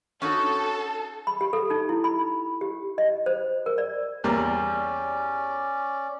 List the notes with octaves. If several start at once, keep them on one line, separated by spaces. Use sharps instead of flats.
C#4 D#4 F#4 A4
B5
G4
A4
D#4
E4
B5
G4
D#5
C5
A#4
D5
E2 G3 A#3 C#4 D5